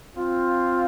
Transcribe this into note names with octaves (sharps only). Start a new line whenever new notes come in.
C4 F4